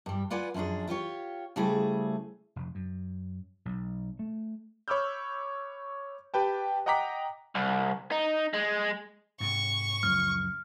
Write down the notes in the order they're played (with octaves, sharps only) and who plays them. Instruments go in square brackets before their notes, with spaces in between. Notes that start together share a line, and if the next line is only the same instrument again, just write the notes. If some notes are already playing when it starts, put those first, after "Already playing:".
[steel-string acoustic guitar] G2 G3
F4 B4 D5 F#5 G#5
F#2 F3 C#4 D4 G#4
E4 F4 G4 C#5
C#3 G3 A3 E4 G#4 C5
[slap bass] F1
F#2
B1
A3
[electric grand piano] C#5 B5 D6 E6 F6 G6
G4 B4 G5 A5
D#5 F#5 G5 A#5 D6 B6
[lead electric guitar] C2
D#4
G#3
[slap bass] G#2 C3 [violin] C#6
[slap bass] C#2 F#2 F3 [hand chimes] F6